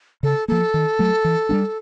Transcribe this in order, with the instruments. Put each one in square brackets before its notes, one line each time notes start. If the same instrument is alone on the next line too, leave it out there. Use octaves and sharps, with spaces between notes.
[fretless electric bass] C#3 [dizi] A4
[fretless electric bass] F3 A#3 [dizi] A4
[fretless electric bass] D#3
F#3 A3
E3
G3 A#3 D4